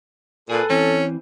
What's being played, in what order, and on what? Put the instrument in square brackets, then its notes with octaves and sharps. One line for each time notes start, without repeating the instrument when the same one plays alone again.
[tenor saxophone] A#2 [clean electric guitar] G#4 B4 [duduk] A4
[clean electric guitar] E3 C4 [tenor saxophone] C#4